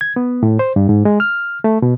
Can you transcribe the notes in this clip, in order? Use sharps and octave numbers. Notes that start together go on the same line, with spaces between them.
G#6
B3
A2
C5
G2
G#2
G#3
F6
A3
B2